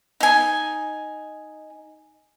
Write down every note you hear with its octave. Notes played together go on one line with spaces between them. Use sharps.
D#4 G#5